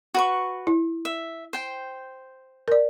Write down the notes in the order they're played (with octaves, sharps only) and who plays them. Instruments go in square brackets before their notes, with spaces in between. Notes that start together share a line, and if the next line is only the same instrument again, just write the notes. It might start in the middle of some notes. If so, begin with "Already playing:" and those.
[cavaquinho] F#4 B4 C#6
[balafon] E4
[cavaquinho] E5
C5 G5
[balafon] A#4 D5